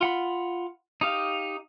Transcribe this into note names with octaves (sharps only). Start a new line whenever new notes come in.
F4 F#5 B5
D#4 G4 F5